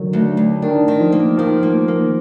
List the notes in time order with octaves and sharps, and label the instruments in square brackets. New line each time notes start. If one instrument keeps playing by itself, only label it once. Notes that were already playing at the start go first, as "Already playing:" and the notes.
Already playing: [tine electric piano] D3 D#3 F#3
[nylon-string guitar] D2
D2
[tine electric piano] D#3 [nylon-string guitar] D4
[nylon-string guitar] D#3
[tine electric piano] F3
[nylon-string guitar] A#3
[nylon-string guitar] D#3 [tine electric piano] F3
[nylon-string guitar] A#3
A#3